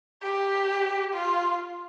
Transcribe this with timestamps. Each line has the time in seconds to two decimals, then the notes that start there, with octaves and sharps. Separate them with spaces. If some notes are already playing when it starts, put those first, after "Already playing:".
0.22 G4
1.13 F4